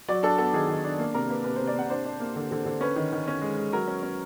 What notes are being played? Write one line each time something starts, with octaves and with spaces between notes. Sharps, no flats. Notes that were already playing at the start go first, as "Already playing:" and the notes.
F#3 D5
D4 A4
B3 A4
D#3 G#4
D#3
D4
A#3
C3 A#4
A#3 B4
C3 B4
C3 C5
D5
C3 F#5
D4 C5
D4
A#3
D3
D3
D3
C#4 B4
D#3
D#3
C#4
G#3
G#3
F#3 A#4
C#4
C#4